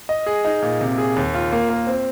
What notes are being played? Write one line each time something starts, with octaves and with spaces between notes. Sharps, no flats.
D#5
G#4
D#4
A#2
C3
G#4
D#2
F4
A#3
A#3
C4